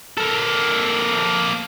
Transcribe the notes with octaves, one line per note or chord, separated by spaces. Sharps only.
A#3 A4